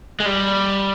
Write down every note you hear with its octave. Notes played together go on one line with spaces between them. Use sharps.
G#3
G3